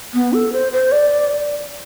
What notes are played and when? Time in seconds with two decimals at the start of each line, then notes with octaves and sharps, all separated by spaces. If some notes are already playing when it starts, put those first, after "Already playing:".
0.14 B3
0.33 A4
0.53 C5
0.72 C5
0.92 D5